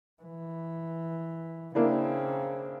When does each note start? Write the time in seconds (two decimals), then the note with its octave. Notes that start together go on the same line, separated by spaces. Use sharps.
0.22 E3
1.75 C#3 A#3 C4 D4 E4